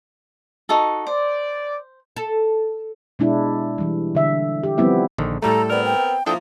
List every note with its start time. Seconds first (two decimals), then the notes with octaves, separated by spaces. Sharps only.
0.69 D#4 F#4 A4
1.07 C5 D5
2.16 A4
3.19 B2 G#3 D4 E4
3.78 E3 G3
4.15 D3 E5
4.63 G4
4.78 F3 G3 B3 C4 E4 E5
5.18 A#1 D3 D#3
5.43 A2 G3 A3 A4 A#5
5.70 B3 C4 A#4 D5
5.85 G5
6.26 F3 A#3 D4 E4 A4 G5 D#6